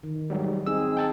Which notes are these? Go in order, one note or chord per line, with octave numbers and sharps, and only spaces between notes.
D#3
G#2 F#3 G3
C4 D#4 G#4 E6
G5 A5 E6